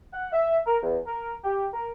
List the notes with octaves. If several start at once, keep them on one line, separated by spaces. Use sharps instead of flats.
F#5
E5
A#4
E2
A#4
G4
A#4